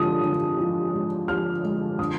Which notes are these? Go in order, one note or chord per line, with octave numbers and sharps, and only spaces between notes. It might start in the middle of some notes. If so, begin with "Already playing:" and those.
Already playing: D3 F3 G#3 D#6
D3
F3
G#3
F3 F6
G#3
D3 D#6